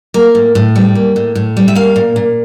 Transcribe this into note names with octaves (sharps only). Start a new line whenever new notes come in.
A#3 A#4
A2
A2
G3
A#3
A2
A2
G3
E5
A#3 F5
A#2
A#2